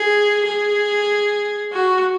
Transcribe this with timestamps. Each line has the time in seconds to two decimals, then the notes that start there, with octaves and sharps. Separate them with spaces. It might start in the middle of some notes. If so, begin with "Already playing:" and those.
Already playing: G#4
0.47 G#4
1.73 F#4